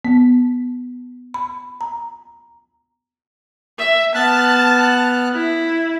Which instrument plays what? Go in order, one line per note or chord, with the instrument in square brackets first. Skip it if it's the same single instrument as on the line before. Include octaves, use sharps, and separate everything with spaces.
[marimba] B3
B5
A#5
[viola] E5
[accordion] B3 F6 F#6 [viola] A5
[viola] E4